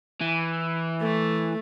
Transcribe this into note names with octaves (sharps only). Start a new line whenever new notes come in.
E3
A3